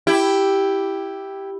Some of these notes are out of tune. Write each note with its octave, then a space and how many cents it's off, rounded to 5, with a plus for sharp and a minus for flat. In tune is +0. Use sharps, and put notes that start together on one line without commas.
E4 +0 G4 +0